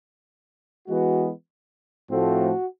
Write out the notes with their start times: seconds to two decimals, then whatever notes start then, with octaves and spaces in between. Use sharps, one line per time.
0.88 E3 G#3 B3 F#4
2.10 A2 F3 A3 C4 F#4